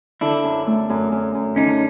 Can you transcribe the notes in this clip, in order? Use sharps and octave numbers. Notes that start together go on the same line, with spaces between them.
D3 D4 E4
F#2
A3
F#2
F#2
F#2
D3 C#4 D#4